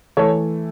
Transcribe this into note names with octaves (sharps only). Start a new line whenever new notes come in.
E3 A3 A4 C#5